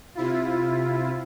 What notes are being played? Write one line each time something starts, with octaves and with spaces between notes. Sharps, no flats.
C3 E4 F4